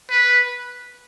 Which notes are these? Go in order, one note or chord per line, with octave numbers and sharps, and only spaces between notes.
B4